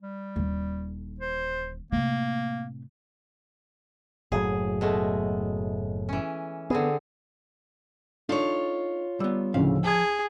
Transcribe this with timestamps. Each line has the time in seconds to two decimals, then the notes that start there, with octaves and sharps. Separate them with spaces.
0.01 G3
0.36 D#1 D3
1.20 C5
1.92 A2 C3 A#3
4.32 F#1 A2 F#3 G#4
4.81 B2 G#3 A3
6.09 E3 C#4
6.70 D3 B3 C4 G#4
8.29 D4 D#4 F4 A4 C#5
9.20 G3 B3 D5 E6
9.54 A1 D2 C#3 F3 F5
9.84 G#4 A5 G#6